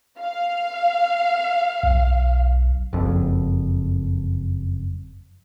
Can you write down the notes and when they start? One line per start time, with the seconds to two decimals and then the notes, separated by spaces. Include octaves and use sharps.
0.19 F5
1.83 B1
2.93 F#1 F2